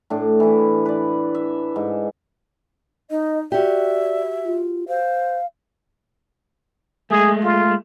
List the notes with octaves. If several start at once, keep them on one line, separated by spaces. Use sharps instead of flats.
A2 D4
E3 E4
B4 D5
E5
G#2
D#4 D#5
F#4 G4 D5 E5
F4
C5 F5
G#3 A3 G#4
F4